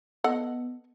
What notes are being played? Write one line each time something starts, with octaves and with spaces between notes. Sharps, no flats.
B3 A4 D#5 F#5